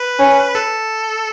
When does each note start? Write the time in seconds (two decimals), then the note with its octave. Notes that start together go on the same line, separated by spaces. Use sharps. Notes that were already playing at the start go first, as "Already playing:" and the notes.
Already playing: B4
0.19 C#4
0.55 A4